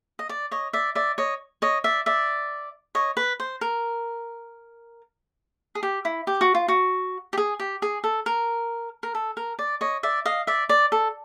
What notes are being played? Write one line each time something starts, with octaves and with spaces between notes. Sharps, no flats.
D#5
D5
C#5 D#5
D5 E5
D5 E5
C#5 D#5
C#5 D#5
D5 E5
D5 E5
C#5 D#5
B4
C5
A#4
G#4
G4
E4
G4
F#4
F4
F#4
G4
G#4
G4
G#4
A4
A#4
A#4
A4
A#4
D5
C#5 D#5
D5 E5
D#5 F5
D5 E5
D5
A4